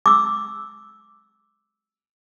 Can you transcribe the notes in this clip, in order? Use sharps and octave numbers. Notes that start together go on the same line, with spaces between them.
D6 E6